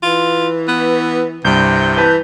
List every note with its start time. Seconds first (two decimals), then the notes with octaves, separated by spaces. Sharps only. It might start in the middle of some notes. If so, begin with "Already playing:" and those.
0.03 E3 F4
0.68 B3
1.45 C2 G2 C3 G6
1.98 E3 B4 A5 B5